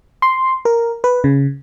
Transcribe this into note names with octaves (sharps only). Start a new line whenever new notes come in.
C6
A#4
B4
C#3